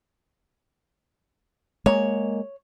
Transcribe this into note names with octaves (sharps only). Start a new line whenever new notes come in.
G#3 A#3 C#5